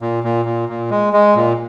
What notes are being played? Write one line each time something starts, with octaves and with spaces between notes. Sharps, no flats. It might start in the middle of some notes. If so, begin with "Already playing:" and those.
A#2
A#2
A#2
A#2
G#3
G#3
A#2